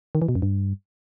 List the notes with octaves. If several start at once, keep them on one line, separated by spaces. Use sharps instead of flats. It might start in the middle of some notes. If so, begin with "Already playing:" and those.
D#3
E3
B2
F#2
G2